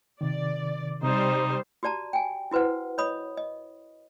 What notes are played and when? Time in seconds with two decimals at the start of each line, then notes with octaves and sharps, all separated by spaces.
0.21 C3 D#3 D5
1.03 C3 G3 D#4 C5
1.83 F#4 G4 D5 A5 A#5
2.13 G5 G#5
2.51 E4 F#4 B4 C5 F#5
2.98 C#5 D#5 B5 D#6
3.37 D#5